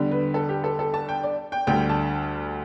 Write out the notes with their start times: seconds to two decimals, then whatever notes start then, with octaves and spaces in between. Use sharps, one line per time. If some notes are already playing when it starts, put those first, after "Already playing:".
Already playing: E2 D3 G3
0.11 B4
0.34 A4
0.49 G4
0.64 A4
0.79 A4
0.94 A5
1.09 G5
1.23 D5
1.52 G5
1.67 D2 D3 G3 G5
1.89 A5